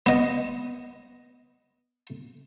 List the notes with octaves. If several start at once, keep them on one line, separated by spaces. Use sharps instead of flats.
B3 D#5